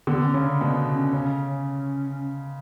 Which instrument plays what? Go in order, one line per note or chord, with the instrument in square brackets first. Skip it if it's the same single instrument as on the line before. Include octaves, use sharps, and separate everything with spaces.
[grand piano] D3 [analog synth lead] B3
[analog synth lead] B3
C#4
[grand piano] C#3
[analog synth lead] D4
[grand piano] B2 [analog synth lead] D4
[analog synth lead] C#4
[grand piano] C#3